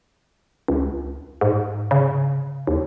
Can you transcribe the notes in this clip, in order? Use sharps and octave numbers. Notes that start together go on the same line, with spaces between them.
C#2
G#2
C#3
D#2